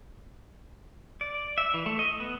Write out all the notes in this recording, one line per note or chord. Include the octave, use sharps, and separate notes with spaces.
D5
E5
E3
A3
D#5
B3